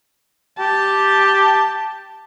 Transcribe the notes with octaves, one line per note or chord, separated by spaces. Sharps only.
G4 A5